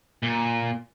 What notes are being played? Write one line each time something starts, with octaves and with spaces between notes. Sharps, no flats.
A#2